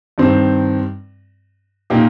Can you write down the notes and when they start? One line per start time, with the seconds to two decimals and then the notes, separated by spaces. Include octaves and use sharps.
0.18 G2 D#3 C4
1.90 A#2 A#3 D#4 G4